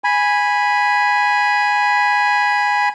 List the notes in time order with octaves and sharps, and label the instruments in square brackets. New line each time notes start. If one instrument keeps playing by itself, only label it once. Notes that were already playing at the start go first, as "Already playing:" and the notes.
[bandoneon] G#5 B5